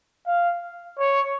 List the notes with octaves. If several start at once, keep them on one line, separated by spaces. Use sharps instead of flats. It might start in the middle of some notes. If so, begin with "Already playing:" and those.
F5
C#5